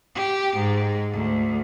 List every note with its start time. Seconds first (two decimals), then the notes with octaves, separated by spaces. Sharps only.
0.15 G4
0.57 G#2
1.13 D2